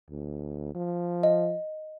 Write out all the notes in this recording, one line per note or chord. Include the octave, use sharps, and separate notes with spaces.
D2
F3
D#5